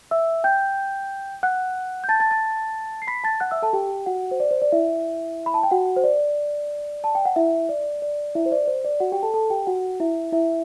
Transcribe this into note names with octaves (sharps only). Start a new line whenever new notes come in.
E5 E6
G5 G6
F#5 F#6
G6
A5 A6
A5 A6
A5 A6
C7
B5 B6
A5 A6
F#5 F#6
E5 E6
A4 A5
G4 G5
F#4 F#5
C5
D5
C5
D5
E4 E5
B5
A5
G5
F#4 F#5
C5
D5
A5
G5
F#5
E4 E5
D5
D5
E4 E5
C5
D5
C5
D5
F#4 F#5
G4 G5
A4 A5
A4 A5
G4 G5
F#4 F#5
E4 E5
E4 E5